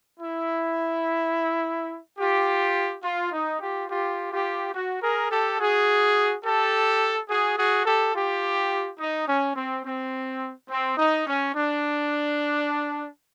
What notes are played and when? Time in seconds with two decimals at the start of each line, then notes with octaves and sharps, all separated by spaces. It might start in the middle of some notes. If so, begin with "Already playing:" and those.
0.20 E4
2.19 F4 G4
3.04 F4
3.32 D#4
3.60 F4 G4
3.89 F4 G4
4.31 F4 G4
4.74 F#4
5.02 G#4 A#4
5.30 G4 A4
5.59 F#4 G#4
6.44 G4 A4
7.29 F#4 G#4
7.57 F#4 G#4
7.86 G4 A4
8.14 F4 G4
8.99 D#4
9.27 C#4
9.56 C4
9.84 C4
10.69 C4
10.97 D#4
11.26 C#4
11.54 D4